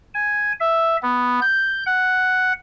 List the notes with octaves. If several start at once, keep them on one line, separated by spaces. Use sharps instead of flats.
G#5
E5
B3
G6
F#5